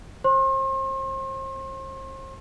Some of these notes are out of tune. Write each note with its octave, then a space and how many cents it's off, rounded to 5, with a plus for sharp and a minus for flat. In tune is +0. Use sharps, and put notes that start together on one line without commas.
C5 +35 C6 +40